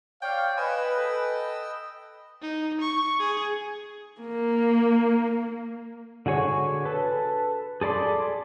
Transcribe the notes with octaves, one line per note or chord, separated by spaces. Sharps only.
C#5 D5 F5 G5
B4 D#5 G5 G#5 E6
A4
D#4
C#6
G#4
A#3
D3 F#4 G#4 C#5
A4 B4
G#4 A4 D5 B5 C6